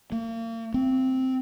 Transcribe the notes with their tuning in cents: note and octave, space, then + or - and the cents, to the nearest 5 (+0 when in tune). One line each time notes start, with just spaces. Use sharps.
A#3 -35
C4 -5